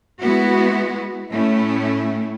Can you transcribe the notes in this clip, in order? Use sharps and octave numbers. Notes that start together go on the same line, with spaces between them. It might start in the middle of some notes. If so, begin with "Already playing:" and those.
G#3 B3 E4 F#4
A2 A3 C#4 E4